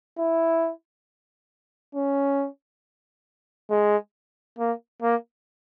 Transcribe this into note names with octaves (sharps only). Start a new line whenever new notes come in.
E4
C#4
G#3
A#3
A#3